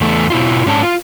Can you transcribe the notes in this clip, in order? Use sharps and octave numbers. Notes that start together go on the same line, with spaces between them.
E2 A3
B2 E4 F4
G#2 C#4 D4 A4 A5
F4